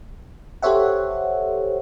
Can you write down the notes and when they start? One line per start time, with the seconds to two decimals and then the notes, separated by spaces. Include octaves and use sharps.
0.62 G4 A4 C5 C#5 E5 F#5